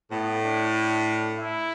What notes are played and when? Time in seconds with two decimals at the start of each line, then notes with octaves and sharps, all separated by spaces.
0.10 A2 B3
0.42 D4
0.73 D4
1.36 E4